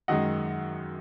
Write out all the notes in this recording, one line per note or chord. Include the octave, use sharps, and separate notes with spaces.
F#2 D#3 G#3 D#5 F#5